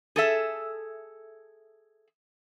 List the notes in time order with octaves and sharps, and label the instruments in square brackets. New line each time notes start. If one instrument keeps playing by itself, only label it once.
[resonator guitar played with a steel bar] G#4 A4 E5